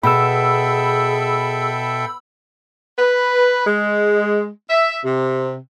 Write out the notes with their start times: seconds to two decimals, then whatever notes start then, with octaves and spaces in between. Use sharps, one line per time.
0.03 B2 G#4 A4 E5 G5 B5 E6
2.98 B4
3.66 G#3
4.69 E5
5.04 C3